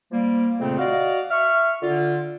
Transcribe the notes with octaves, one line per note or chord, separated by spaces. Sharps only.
F3 G3 A#3
F2 A#2 C#3 A3 C4
F#4 D5 D#5 F5
E5 C#6 F6
D3 F4